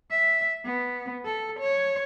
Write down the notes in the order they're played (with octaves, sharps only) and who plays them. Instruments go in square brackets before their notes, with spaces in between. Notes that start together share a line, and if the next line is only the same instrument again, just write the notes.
[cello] E5
B3
A4
C#5